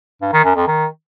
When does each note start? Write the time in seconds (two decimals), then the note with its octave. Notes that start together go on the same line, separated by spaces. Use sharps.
0.22 G2
0.33 D#3
0.45 F#2
0.56 F2
0.67 D#3